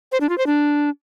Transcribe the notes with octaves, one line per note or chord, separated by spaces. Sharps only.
C5
D4
F4
C5
D4